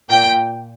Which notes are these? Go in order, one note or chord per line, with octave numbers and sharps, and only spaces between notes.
A#2 G5